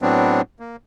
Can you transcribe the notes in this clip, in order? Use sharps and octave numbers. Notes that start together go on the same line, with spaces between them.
A2 F#3 B3 C4 D4
A#3